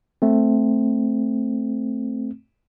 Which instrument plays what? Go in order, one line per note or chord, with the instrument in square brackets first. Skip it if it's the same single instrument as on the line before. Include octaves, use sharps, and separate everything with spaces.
[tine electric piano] A3 C4